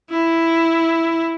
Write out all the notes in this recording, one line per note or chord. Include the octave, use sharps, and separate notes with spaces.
E4